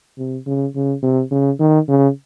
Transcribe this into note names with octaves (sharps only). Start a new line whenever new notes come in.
C3
C#3
C#3
C3
C#3
D#3
C#3